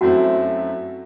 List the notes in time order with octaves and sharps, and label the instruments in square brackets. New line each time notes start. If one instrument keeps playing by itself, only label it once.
[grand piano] F#2 F#3 A3 C4 E4 [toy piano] F#4 F#5